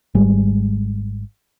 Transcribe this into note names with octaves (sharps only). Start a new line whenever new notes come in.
G#1 G3 G#3